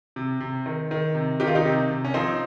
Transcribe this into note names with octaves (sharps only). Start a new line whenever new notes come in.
C3
C3
D#3
D#3
C3
D#3 G4
F4
D#4 G4
C3
C3
C#4
F3 C4 D#4